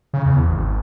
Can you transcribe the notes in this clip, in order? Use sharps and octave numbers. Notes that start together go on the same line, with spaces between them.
C#3
E2
G#1